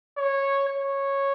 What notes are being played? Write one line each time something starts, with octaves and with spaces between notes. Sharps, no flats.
C#5
C#5